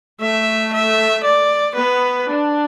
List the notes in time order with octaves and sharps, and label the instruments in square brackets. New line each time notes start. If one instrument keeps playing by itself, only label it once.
[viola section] A3 [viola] E5
[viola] E5
D5
[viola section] B3 [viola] B4
[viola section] D4